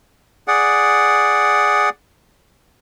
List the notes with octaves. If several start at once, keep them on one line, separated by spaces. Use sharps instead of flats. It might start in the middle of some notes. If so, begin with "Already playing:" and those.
G#4 D5 F#5